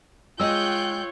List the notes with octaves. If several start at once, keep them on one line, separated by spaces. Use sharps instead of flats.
G#3 F4 C#5 D#5 G5 E6 F#6 G6